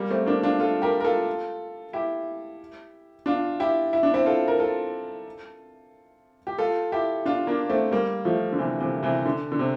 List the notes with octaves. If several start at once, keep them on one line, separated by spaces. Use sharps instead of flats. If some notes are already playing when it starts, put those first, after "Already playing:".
Already playing: G3 A#3
A3 C4
A#3 D4
D4 F4
F4 A4
G4 A#4
A#4
F4 A4
E4 G4
D4 F4
E4 G4
E4
D4
C4 E4
F4 A4
A#4
F4 A4
G4
F4 A4
E4 G4
D4 F4
A#3 D4
A3 C4
G3 A#3
F3 A3
D3
C3 E3
C3 E3
C3 E3
D3
D3
C3